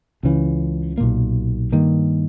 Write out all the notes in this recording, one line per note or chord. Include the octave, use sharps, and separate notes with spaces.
C#2 C#3 E3
B1 A#2 A#3
G2 D#3 A#3